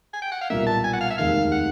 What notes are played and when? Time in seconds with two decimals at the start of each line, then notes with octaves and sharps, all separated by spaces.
0.14 G#5
0.22 G5
0.32 F#5
0.41 F5
0.50 B1 A#2 G3 A#3 E5
0.67 A5
0.84 G#5
0.93 F#5
1.01 F5
1.10 E5
1.18 F1 D#2 D#3 G#3 F5
1.52 F#5